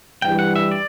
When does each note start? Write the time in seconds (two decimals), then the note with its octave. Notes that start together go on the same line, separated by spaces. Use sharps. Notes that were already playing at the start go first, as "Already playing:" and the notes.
0.22 G2 E3 G3 G5
0.39 F#5
0.56 E5
0.72 D5